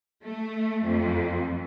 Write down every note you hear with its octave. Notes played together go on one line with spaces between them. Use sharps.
A3
F2